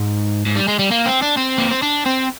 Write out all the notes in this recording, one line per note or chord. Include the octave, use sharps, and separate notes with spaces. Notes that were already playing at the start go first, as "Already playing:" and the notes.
Already playing: G#2
G#2
G3
G#3
G3
A#3
C4
D4
C4
A#3
C4
D4
C4